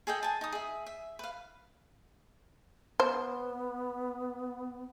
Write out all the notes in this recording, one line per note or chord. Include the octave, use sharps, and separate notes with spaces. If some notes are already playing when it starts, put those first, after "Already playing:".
G#4 A4 D#5 G5
G#5 A5
D#4 D#6
G#4 E5
E5
B4 F5
B3 C5